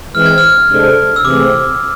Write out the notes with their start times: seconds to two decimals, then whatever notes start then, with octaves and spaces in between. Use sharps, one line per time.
0.15 E3 G#3 C4 F6
0.26 G#6
0.38 F6
0.69 C3 G#3 D4 A4 C5
1.16 E6
1.24 C3 E3 A3 C4 G#4 D6